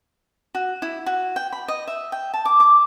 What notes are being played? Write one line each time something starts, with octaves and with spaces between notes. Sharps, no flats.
F#4
E4
F#4
G5
B5
D#5
E5
G5
A5
D6
D6